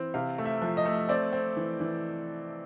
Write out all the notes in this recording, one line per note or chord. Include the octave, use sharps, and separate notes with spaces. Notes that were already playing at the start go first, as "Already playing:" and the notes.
Already playing: E3 C4
C3 F5
A3
E5
F3
D#5
A3
C4 D5
C4
E3
E3